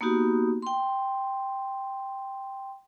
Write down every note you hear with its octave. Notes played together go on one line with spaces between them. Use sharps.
A#3 B3 D#4 F#4 G4
G5 C6